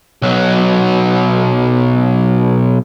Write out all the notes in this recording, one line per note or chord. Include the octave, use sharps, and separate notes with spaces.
B1 F#3